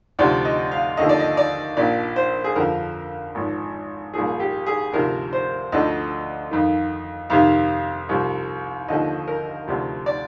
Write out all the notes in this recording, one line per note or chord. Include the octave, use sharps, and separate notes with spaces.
D2 C3 F3 D5
D#5
F5
D#2 D3 F3 D#5
D5
D#5
D5
A#1 A#2 F3 D5
C5
G#4
F2 D3 F3 A#4
G#1 G#2 F3
C2 A#2 F3 G#4
G4
G#4
D2 C3 F3 A#4
C5
D2 D3 F3 D#5
F2 D#3
F2 C3 D#3 F5
C2 C3 F3
D#2 D3 F3 D#5
A#4
D2 C3 F3
D5